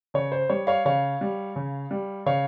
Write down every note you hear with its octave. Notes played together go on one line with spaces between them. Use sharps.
C#3 C#5
C5
G3 C#5
C#5 F5
C#3 C#5 F5
G3
C#3
G3
C#3 C#5 F5